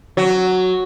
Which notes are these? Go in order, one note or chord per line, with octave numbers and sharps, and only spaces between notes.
F#3